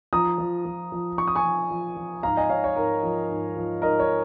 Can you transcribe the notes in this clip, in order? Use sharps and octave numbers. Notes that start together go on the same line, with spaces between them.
F3 A#5 D#6
F3
F3
F3
F3 C#6
D#6
G#5 C#6
F3
F3
F3
G#2 F5 A#5
D#5 G#5
G#2 C#5 F5
C#5
G#2 A#4
F3
G#2
F3
G#2 A#4 D#5
C#5